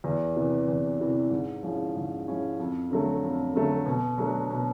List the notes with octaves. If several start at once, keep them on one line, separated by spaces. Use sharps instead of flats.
E2
C3 E3
E2
C3 E3
G#2
F3 G#3 C#4 E4
G#2
F3 G#3 C#4 E4
F2
D3 F#3 A3
F2
D3 F#3 A3
B2
F#3 A3 D4
B2